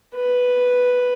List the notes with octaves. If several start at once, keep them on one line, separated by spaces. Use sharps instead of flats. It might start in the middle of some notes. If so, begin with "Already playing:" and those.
B4